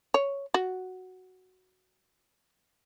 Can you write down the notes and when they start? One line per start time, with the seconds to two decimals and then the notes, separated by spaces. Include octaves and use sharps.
0.14 C#5
0.54 F#4